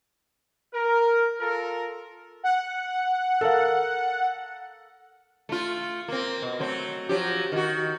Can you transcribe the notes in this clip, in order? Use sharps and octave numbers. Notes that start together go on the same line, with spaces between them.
A#4
F4 A4 A#4
F#5
A4 A#4 F5
A3 F4
A#3 C4
B2
F#3 A3 C4
F3 F#3 G4
D#3 F#4